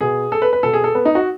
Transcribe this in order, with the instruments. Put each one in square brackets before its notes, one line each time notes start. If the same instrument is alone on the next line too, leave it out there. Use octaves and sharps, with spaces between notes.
[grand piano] B2 G#4
A4
B4
B4
B2 A4
G#4
A4
B3
D#4
F#4